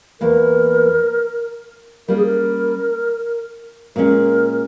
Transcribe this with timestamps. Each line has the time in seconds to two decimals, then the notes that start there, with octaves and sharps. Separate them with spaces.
0.21 E2 E3 A#3 A#4
2.08 G3 A#3 C#4 A#4
2.17 G#4
2.26 A#4
3.96 A#2 G#3 C#4 A#4